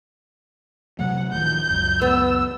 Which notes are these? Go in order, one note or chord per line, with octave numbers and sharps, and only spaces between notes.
C3 F#3 A3 F#5
D1 D#3 F3 G6
C#2 F#2
B3 E6